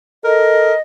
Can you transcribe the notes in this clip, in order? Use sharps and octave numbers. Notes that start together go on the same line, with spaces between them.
A4 A#4 D#5